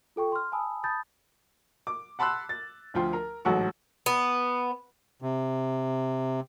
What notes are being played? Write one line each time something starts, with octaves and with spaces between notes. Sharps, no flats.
F4 A4 G5 C#6
C6 F6
G#5 A5 B5 D#6 E6
A5 B5 D#6 G6 A6
D6
F#5 A5 B5 C6 E6 F#6
A6
D2 F3 F4 G5 C6
A#4
A1 G#2 F#3 F#4 A4 C#6
B3
C3